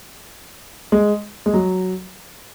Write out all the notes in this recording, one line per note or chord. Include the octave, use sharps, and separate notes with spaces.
G#3
G#3
F#3